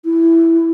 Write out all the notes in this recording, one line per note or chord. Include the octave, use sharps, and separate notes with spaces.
E4